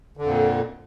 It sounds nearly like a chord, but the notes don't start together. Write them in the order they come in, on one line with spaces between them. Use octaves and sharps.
D3 F2 A#2